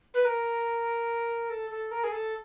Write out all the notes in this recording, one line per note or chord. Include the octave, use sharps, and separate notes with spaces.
B4
A#4
A4
A4
A#4
G#4
A4